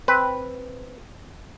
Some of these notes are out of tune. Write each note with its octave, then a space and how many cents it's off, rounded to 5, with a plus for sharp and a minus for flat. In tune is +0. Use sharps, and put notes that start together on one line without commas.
C4 +0 B4 +0